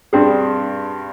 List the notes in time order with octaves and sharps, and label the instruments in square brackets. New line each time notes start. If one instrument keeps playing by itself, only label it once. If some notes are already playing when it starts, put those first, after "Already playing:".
[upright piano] G2 G3 C4 [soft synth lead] G#4